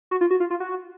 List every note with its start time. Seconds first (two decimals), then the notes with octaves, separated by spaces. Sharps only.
0.11 F#4
0.21 F4
0.31 F#4
0.40 F4
0.50 F4
0.60 F#4